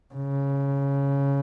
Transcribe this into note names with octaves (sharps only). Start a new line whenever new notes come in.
C#3